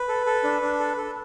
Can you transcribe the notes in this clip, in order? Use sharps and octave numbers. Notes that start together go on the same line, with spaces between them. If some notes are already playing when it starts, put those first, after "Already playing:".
Already playing: B4
A4
A4
D4
D4
A4
A4